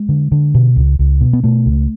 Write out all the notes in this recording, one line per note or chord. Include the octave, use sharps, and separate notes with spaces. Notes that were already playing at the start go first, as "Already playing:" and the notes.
Already playing: G#3
D3
D3
B2
C#2
C#2
B2
B3
B2 A3
C#2